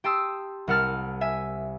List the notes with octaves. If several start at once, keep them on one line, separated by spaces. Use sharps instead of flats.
G4 G5 A5 C6 D#6 E6
C2 A#4 F#5 A5 F6 A6
E5 G#5